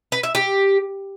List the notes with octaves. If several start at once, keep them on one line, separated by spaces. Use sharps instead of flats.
B4
E5
G4